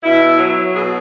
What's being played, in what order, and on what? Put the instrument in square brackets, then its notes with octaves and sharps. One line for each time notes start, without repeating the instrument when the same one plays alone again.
[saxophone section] B2 E4
F#3
B2 G#4